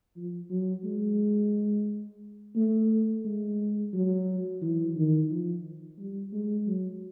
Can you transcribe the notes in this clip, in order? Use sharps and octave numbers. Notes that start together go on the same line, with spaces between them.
F3
F#3
G#3
A3
G#3
F#3
E3
D#3
F3
G3
G#3
F#3